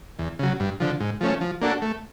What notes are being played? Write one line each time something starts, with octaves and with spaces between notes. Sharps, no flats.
E2
C#3 F#3
G2
D3 F3
G#2
F3 A3 C#4
F3
A#3 D4 F#4 A4
A3